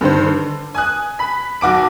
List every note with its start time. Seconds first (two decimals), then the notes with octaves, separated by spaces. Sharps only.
0.01 G2 D3 D#3 C5
0.26 D3
0.74 G#5 D#6 F#6
1.19 B5 B6
1.61 B1 F#4 D6 D7